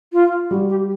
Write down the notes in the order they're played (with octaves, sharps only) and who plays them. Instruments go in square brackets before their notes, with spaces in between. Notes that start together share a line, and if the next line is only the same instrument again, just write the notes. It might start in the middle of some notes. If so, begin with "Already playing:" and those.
[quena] F4
[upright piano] G3 [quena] F#4
[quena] G4